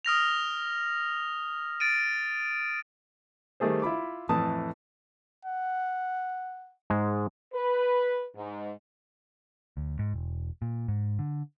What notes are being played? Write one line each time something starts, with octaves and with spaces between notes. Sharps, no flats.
D#6 F6 A#6 F7
A6 D7 D#7
D#3 G3 A3 G#4 C5
E4 F4 B5 D6
F2 A2 E3 A5 D#6
F#5
G#2 G#3
B4
G#2
D2
G#2
E1
A#2
G#2
D3